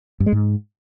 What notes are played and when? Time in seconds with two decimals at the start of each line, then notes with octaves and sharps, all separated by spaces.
0.20 G2
0.26 G#3
0.32 G#2